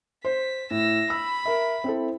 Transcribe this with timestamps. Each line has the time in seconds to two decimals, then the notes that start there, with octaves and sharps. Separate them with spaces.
0.25 C5 B6
0.71 A2 E6 A#6
1.10 B5 E6
1.46 A#4 E5
1.84 C4 E4 A4